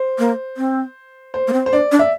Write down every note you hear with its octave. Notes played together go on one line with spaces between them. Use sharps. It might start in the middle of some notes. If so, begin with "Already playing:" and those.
Already playing: C5
A#3
C4
C5
A#3
C4
C5
D4 D5
D4
E5